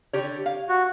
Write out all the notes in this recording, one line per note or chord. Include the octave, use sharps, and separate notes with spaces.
D3 G4 C#5
F5
F#4